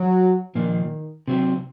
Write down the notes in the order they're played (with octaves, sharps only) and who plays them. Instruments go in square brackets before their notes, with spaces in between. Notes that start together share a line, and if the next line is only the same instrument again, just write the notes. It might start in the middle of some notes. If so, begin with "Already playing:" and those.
Already playing: [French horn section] F#3
[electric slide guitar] A#2 F3 A#3 [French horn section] D#3
[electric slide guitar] C3 F#3 C4